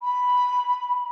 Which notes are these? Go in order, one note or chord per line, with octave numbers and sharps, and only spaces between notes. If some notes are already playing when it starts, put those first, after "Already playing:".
B5